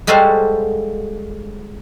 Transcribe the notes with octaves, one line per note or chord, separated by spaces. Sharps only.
G3 G#3 F#4 A4 C5 F5